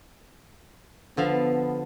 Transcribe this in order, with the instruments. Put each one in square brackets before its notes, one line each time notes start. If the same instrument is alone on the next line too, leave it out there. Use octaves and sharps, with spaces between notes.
[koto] D3 F3 F5 [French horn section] B3